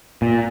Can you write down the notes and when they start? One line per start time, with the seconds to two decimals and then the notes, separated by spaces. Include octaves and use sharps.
0.22 A#2